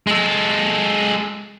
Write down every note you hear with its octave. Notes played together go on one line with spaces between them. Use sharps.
G#3 A4